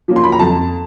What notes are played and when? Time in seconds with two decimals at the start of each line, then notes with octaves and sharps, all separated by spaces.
0.08 F3 A#3 C#4
0.16 C6
0.24 B5
0.32 A#5
0.39 F2 A5